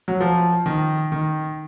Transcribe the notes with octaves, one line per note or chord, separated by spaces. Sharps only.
F#3
F3
D#3
D#3